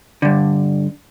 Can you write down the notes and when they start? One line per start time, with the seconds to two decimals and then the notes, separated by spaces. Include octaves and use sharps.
0.22 G2 D3